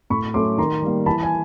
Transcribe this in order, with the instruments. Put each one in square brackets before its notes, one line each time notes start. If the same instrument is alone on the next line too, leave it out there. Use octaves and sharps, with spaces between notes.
[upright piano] A2 B5 C#6
F#3 A3 C#4 C6 D6
D#3 A#5 C6
G3 A#3
E3 A5 B5
G#5